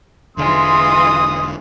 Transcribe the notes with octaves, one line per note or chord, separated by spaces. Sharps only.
E1 D3 E3 G#3 F4 C6 D#6